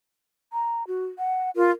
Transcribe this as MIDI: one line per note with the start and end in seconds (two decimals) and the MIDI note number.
0.53 0.86 82
0.87 1.06 66
1.18 1.50 78
1.56 1.71 65
1.56 1.69 70